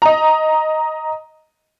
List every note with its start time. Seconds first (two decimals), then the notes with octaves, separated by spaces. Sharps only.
0.02 D#5 A#5